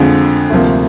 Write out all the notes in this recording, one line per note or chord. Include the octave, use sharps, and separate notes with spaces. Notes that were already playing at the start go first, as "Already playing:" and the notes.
Already playing: F2 D3 F3 G#3
D2 C3 F3 A#3